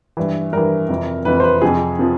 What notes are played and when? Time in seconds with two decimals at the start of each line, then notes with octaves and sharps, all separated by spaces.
0.17 G2 E3
0.53 G2 E3 A#4
0.89 F2 C3 E3
1.25 F2 C3 E3 B4
1.40 C5
1.44 B4
1.62 F2 C3 F3 G#4
1.99 C3 F3